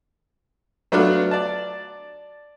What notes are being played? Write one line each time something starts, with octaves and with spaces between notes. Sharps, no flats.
F#3 A3 B3 D4 F4 F#4
D5 A5